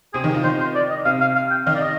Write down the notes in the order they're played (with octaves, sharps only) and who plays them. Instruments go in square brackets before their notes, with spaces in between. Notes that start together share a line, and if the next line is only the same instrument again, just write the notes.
[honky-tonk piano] C3 C4 [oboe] G#4
[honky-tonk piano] D#3 D#4
F3 F4
[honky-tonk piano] D#3 D#4 [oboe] C5
[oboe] C5
D5
D#5
[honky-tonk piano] C3 C4 [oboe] F5
[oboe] F5
F5
G5
[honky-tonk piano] D#3 D#4 [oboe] F5
[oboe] D5
D#5